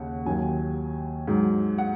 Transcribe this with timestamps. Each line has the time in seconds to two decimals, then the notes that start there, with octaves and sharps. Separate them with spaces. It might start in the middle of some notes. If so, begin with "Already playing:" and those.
Already playing: D#2 C#3 F#5
0.25 D#2 D#3 F#3 G#5
1.28 G#2 F#3
1.78 F#5